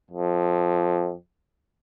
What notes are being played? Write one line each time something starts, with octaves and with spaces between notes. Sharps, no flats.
F2